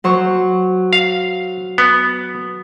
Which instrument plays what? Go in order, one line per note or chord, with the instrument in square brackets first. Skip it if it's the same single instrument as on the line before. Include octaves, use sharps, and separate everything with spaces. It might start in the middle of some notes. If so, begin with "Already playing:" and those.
[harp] F#3 C5 C#6
[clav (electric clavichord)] F5
B3